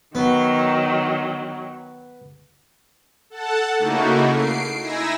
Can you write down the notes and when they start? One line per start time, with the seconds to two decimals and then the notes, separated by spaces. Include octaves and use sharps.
0.15 D#3 F#3 B3
3.30 A4 F#5 A5
3.79 C#3 A3 A#3 D#4 E4 F#4
4.31 C7 D7
4.80 D#4 E4 G#5 E6 A#6